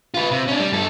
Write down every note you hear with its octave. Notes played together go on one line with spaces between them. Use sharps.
F4 B4
C3
C#4 D4
G3
G2 A4